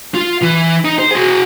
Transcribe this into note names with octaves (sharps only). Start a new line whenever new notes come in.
F4
E3
D#4
C5
F#4 G#4